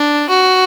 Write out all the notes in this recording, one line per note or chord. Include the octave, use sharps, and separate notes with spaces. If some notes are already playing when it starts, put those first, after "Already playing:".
Already playing: D4
F#4